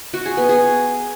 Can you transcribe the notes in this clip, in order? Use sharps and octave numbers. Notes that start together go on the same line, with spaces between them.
F#4
G#4
B3
G#4